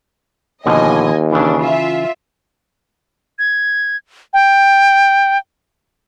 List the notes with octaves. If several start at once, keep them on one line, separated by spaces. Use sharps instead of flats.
D#2 B2 D3 F3 D#5 G#5
C#3 E3 D4
F4 E5
G#6
G5